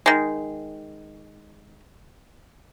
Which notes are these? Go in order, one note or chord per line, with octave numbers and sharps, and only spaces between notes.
D#3 G#3